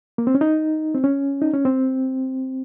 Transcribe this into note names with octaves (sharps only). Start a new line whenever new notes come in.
A#3
C4
C#4
D#4
C4
C#4
D#4
C#4
C4